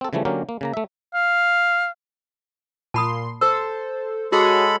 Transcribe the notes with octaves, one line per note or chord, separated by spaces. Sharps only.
C4 A4
C#3 E3 F3 G3 A3
D3 F#3 A#3 C#4 G4 A#4
A#3
C#3 A#3 A#5
A3 E5
F5
A#2 A5 B5 C6 D#6
A4 C5 E6
G#3 F#4 G#4 A4 C#5 B5